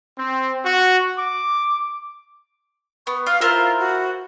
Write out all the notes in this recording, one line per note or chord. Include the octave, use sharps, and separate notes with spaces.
C4
F#4
D6
B3 C#6
F4 F5 F6
E4 F4 A#4 C5
F#4